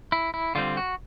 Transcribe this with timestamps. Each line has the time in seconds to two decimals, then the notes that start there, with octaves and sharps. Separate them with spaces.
0.12 E4
0.34 E4
0.55 D3 G3 C4 F4
0.77 F#4